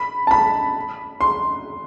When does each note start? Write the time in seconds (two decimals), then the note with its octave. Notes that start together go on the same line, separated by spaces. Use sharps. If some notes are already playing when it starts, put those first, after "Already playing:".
Already playing: B5
0.27 A5
0.31 B5
1.21 C6